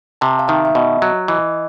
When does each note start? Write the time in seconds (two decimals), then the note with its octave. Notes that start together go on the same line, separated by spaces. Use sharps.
0.21 C3 A5
0.39 F5
0.48 D#3 E5
0.65 E5
0.75 B2 D#5
1.02 F#3
1.28 E3 D#5